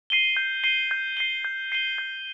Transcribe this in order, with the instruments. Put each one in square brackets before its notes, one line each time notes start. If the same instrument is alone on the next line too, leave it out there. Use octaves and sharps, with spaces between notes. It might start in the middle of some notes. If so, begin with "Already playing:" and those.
[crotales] C7 D#7 G7
G6
C7 D#7 G7
G6
C7 D#7 G7
G6
C7 D#7 G7
G6